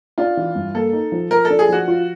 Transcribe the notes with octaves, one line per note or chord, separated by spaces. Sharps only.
D4 F4
E3
G2
A#3 A4
D#4
F3
F3 A#4
A4
D4
G#4
F3 F#4
F4